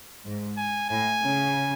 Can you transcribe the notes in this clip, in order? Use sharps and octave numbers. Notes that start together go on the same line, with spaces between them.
G#2
G#5
A2 G#5
C#3